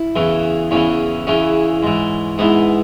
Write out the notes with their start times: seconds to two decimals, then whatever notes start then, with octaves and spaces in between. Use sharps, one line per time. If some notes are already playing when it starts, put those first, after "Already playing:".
Already playing: E4
0.16 E2 C#3 E3
0.71 E2 C#3 E3 C#4
1.27 E2 C#3 E3 C#4
1.83 G#2 E3
2.38 G#2 E3 B3